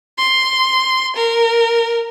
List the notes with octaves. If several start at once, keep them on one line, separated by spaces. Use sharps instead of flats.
C6
A#4